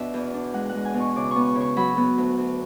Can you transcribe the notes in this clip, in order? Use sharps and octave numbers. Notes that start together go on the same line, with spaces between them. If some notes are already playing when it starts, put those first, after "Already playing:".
Already playing: B2 D4 E5
E2
D4
G#3 F#5
F#5
G#3
G#5
B2
C#6
C#3 D6
B3 C#6
C#6
C#3
C#6
F#3 B5
B3
D2
D2